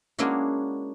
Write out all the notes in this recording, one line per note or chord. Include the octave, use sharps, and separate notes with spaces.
G#3 A#3 C#4 D4 E4 F#4